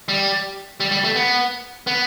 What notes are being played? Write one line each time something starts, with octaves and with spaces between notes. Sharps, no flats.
G3
G3
G3
A3
B3
B3